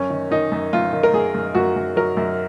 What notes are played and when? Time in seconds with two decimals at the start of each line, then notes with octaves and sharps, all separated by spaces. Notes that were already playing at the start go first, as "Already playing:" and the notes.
Already playing: F#2 C#4
0.10 D#3
0.31 D#3 D#4
0.52 F#2
0.73 F#2 F4
0.93 D#3
1.03 A#4
1.13 F#2 G#4
1.34 F#2
1.55 F#2 F#4
1.76 F#2
1.96 F#3 A#4
2.17 F#2